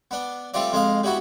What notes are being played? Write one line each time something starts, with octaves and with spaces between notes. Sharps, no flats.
B3 D4
G3 A3 C4 F4 D5
F2 G#3 D#5 F5
G3 B3 E4 F#4